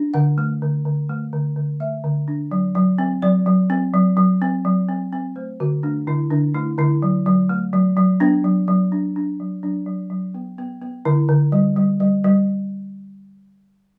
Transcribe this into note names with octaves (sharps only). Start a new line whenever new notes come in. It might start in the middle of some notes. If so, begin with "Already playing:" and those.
Already playing: D4
D3 F#5
A3
D3
D3
A3
D3
D3
A3 E5
D3
D4
F#3
F#3
C4
F#3 D5
F#3
C4
F#3
F#3
C4
F#3
C4
C4
A3 C5
D3 F#4
A3 D4
D3 E4
D3 D4
A3 E4
D3 E4
F#3
F#3
A3
F#3
F#3
B3 D4
F#3
F#3
D4
D4
F#3
F#3 D4
F#3
F#3
B3
B3
B3
D3 E4
D3
G3
G3
G3
G3